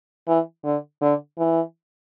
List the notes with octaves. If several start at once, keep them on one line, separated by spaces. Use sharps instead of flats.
E3
D3
D3
E3